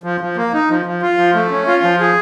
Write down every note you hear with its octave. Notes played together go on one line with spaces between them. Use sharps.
F3
F3
A#3
D#4
F3
F3
F4
F3
A3
C#4
F4
F3
G#4